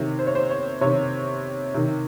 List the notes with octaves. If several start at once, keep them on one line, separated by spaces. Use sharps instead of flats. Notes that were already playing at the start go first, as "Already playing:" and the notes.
Already playing: C3 D#3 C#5
C5
C#5
C5
C#5
C3 D#3 C#5
C3 D#3